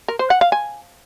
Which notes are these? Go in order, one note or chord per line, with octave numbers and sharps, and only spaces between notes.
A#4
C5
F#5
F5
G#5